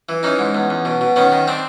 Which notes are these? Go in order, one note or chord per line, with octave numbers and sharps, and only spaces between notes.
E3
E3 C#4 D#4
G#2
E2
E2
B2
B2
D#3 B3 C#4
D#3
C4 D4